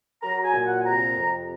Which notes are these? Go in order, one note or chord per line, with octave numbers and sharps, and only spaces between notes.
F#3 A#5
G#5
A#2
F#5
G#5
C3 A#5
F2